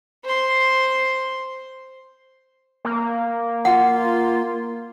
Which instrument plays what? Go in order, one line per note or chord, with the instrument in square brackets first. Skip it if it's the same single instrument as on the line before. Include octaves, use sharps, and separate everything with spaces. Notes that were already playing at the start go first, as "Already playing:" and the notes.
[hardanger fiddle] C5 C6
[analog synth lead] A#3
[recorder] F4 [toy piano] F#5